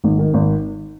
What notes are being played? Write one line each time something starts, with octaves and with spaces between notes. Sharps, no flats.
G#1
D#3
G#1